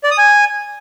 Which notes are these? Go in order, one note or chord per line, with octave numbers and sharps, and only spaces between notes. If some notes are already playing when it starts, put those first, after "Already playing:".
D5
D#6
G#5